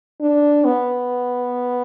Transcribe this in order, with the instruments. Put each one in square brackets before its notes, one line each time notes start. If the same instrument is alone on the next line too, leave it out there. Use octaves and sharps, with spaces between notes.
[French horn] D4
B3